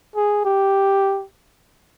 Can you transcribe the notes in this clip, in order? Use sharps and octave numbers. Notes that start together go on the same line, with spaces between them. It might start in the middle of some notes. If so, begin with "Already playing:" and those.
G#4
G4